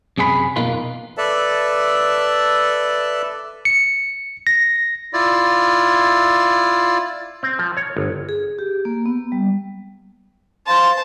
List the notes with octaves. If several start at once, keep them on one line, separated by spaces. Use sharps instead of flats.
F#2 C3 G#4 A#4 B5
F2 B2 A#3 D#4 F4 B4
A4 B4 D5 E5 A5
C#7
A#6
E4 F4 D5
C4
F3
C#5
G1
G#4
G4
A#3
B3
G3
C5 F5 A5 C6